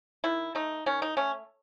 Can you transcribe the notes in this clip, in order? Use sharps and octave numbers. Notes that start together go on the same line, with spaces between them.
D#3 E4
A3 D#4
D#3 C#4
D#4
A3 C#4